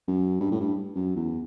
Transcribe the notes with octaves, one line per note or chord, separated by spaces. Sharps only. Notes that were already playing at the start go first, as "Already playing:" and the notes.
F#2
G2
A2
G2
F#2
E2